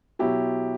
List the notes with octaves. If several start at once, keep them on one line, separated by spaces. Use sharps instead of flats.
B2 F#3 E4 G4